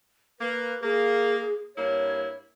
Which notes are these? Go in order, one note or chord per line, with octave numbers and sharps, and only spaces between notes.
A#3 B4
A#3 G#4
G2 A#3 E4 C#5